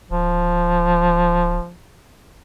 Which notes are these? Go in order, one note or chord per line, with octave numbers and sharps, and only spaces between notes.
D1 F3